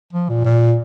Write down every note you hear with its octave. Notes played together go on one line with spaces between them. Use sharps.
F3
A#2
A#2